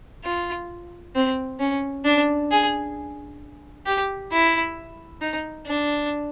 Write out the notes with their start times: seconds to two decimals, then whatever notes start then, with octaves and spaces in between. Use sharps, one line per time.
0.24 F4
1.15 C4
1.60 C#4
2.05 D4
2.51 G#4
3.86 G4
4.32 E4
5.21 D#4
5.67 D4